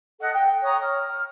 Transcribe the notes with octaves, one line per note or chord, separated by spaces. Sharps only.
A4 D#5 F#5
G5
C#5 A#5 D#6
F6